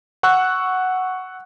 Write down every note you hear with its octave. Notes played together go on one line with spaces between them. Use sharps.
F#5 C#6 E6 F#6